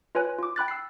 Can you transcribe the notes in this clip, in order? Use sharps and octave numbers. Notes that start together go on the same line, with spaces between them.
F4 B4 C#5 G#5 F#6
F4 D6
G5 B5 F#6 A6
E6 C7